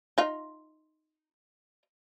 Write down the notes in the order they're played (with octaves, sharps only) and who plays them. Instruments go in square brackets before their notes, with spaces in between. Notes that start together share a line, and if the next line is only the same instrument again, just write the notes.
[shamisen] D#4 F4